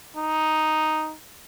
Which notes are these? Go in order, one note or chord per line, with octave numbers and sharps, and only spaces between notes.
D#4